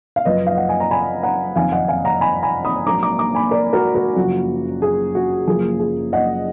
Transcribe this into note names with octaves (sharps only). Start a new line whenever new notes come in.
F5
F#1 F#2 F3 B4 D#5
F5
F#5
G#5
A#5
G#5 B5
F#5 A#5
F#1 F2 D#3 F5 G#5
D#5 F#5
F5 G#5
F#5 A#5
G#5 B5
G#5 B5
B5 D#6
A#1 G#2 F#3 A#3 A#5 D6
A#5 D6
A#5 D6
G#5 B5
A#4 D5
F#4 A#4
F#4 A#4
F#1 F#2 F3 A#3 F#4
G#4
F#4
F#1 F#2 F3 A#3 G#4
G#4
D#5 F#5